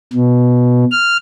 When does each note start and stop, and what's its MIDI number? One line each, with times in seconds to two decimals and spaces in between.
0.13 0.85 47
0.91 1.17 89